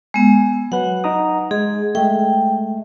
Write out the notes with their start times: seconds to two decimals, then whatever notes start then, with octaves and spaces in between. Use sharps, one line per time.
0.14 G#3 B3 G#5
0.72 F#3 B4 F#5
1.04 D#4 A#5 D#6
1.51 G#3 G#4
1.95 G#3 A3 G5